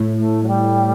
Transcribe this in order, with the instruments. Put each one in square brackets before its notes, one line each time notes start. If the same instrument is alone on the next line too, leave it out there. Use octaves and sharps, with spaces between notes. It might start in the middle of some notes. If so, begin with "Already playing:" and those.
Already playing: [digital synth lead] A2
[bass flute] A3
F#3
G3